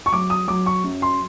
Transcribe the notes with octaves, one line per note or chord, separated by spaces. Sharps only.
C#6
F#3 D6
D#6
F#3 D6
C#6
F#2
C6